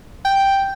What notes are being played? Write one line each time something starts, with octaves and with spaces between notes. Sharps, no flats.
G5